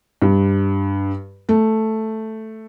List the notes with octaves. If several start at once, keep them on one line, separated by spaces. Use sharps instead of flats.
G2
A3